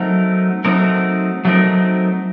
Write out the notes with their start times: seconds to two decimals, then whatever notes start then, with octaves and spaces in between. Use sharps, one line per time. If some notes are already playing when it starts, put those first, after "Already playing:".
Already playing: F#3 A3 C4 D#4 A#4
0.65 F#3 A3 C4 D#4 A#4
1.45 F#3 A3 C4 D#4 A#4